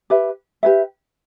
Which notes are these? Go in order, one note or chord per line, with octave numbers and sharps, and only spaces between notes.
G4 B4 E5
G4 B4 E5